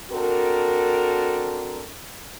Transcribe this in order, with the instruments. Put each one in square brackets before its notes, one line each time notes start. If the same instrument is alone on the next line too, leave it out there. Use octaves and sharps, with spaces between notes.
[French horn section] C4 D4 F#4 A4 A#4